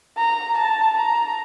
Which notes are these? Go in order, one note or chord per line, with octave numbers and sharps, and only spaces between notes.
A#5
A5
A#5